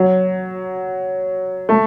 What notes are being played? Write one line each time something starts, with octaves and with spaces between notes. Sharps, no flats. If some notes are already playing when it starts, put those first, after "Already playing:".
Already playing: F#3
A3